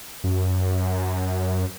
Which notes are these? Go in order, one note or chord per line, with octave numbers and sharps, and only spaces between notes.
F#2